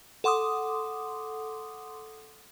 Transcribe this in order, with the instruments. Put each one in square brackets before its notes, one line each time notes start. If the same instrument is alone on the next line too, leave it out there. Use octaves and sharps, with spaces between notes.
[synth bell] A4 F#5 C6 D6 D#6